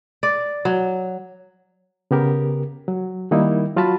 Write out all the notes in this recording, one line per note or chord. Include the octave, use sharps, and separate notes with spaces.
D5
F#3
C#3 B3 G4 A#4
F#3
D#3 G3 A#3 D#4 E4
F#3 F4 F#4 A5 B5